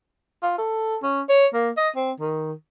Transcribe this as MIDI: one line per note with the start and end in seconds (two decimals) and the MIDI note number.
0.43 0.53 65
0.58 0.96 69
1.03 1.21 61
1.29 1.46 73
1.54 1.70 58
1.77 1.89 75
1.96 2.12 60
2.20 2.53 51